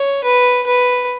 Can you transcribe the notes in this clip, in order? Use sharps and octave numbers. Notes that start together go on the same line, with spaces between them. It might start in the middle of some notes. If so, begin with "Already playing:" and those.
Already playing: C#5
B4
B4